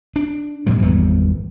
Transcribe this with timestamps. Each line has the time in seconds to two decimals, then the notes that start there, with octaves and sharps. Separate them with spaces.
0.16 D4
0.66 G2 A#2 F3 F#3
0.82 G#1 E2 G3 B3